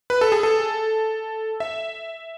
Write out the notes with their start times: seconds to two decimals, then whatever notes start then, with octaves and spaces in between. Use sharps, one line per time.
0.10 B4
0.21 A4
0.32 G#4
0.43 A4
1.60 E5